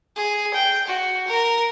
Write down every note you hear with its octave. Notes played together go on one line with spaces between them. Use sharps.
G#4
G5
F#4
A#4